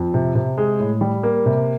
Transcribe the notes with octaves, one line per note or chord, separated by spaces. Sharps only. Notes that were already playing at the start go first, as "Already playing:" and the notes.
Already playing: F2
C3
C3
G#3
A2
G3
A#3
C3